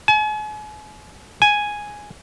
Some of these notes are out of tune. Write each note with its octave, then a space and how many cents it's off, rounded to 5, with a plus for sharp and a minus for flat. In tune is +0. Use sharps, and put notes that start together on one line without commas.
G#5 +40
G#5 +0